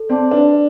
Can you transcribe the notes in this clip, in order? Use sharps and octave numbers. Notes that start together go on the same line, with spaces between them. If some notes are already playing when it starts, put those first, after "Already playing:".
Already playing: A4
C4 D5 A5 D6
D4 B4